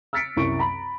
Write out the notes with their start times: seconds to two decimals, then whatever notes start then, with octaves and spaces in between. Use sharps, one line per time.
0.13 E6 F6 A6 B6 C#7 D7
0.36 C2 F#2 C3 E4 C#6 D7
0.59 A#5 B5